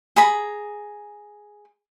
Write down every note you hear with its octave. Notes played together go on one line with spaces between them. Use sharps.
G#4 A#5 B5